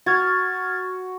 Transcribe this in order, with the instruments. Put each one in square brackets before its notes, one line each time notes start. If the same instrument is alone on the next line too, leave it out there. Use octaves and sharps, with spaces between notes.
[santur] F#4 [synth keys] F6 G#6 A6